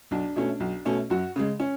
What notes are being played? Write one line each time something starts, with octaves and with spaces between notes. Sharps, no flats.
B1 D4
B2 A3 C#4
B1
B2 A3 C#4
F#2 F#4
C#3 G#3
C#4